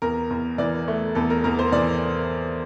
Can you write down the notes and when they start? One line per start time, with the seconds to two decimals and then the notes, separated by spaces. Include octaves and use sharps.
0.02 E2 A#4
0.30 E2
0.58 E3 D5
0.88 A3
1.15 E2 A4
1.30 A#4
1.44 E2 A#4
1.59 C5
1.72 E3 D5